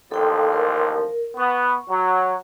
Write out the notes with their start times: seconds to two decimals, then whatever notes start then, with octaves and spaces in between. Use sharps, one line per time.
0.11 A1 D#2 F3 A4 G5
0.53 A#4
1.37 B3 C#6
1.89 F#3